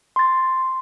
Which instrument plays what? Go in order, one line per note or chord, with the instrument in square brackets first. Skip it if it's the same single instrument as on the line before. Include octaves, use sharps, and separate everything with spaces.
[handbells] C6 A6